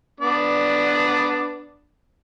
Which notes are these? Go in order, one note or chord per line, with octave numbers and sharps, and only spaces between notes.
B3 D4 D5